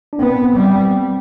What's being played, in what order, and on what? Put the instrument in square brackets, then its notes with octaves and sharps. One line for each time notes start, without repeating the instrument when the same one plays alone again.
[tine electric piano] D4
[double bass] B3 [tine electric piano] C4
[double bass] G3